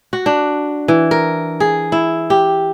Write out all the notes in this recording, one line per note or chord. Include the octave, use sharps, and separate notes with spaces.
F#4
D4
E3
A#4
G#4
E4
G4